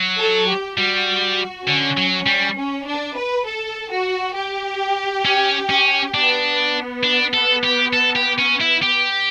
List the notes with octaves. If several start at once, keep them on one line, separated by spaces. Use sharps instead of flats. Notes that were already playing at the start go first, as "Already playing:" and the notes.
Already playing: F#3
A4
G4
G3 F#4
D3 C#4
F#3
G3
C#4
D4
B4
A4
F#4
G4
C#4
C#4
B3 D4
D4
A4
G4
A4
G4
C#4
E4
G4